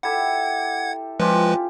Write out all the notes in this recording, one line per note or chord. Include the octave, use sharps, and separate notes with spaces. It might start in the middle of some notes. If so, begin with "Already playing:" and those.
E4 G4 A4 F#5 G#6
F3 G#3 C#4 F4 G4 B4